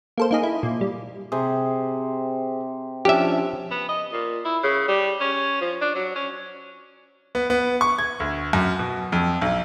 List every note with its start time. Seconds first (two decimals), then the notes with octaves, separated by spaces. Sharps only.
0.18 A#3 A4 C5
0.31 A#3 D#4 G#4
0.43 E4
0.63 A#2
0.81 G3
1.32 C3 G#4 C5
3.05 F3 C#4 D4 G4 E5
3.71 B3
3.89 D#5
4.13 A#2
4.45 E4
4.64 C#3
4.88 G3
5.21 C#4
5.61 F3
5.81 D4
5.95 F#3
6.15 C#4
7.35 B3
7.50 B3
7.81 C#6
7.99 G#6
8.20 D2
8.53 F#2
8.79 B2
9.12 F2
9.41 B1